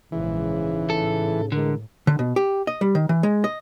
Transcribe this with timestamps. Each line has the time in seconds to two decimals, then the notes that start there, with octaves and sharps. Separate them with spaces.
0.12 A#1 G#2 C#3 E3
0.90 A2 A4
1.52 D3 E3 G#3 A#4
2.07 D3
2.19 B2
2.36 G4
2.67 D#5
2.81 G3
2.95 D#3
3.09 E3
3.23 G#3
3.44 D#5